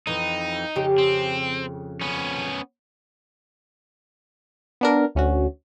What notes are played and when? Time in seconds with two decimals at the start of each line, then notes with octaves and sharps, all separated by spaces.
0.07 F2 E3 D#4
0.76 F2 C#3 G4
0.98 C4
2.01 B3 C#4
4.81 B3 D4 A#4
5.15 D2 C#4 F#4